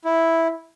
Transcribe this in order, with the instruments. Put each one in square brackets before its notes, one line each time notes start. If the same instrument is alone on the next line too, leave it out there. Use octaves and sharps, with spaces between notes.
[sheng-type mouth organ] E4